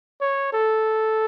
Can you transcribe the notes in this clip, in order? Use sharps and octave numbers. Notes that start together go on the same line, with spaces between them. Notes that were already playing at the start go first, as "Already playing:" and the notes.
C#5
A4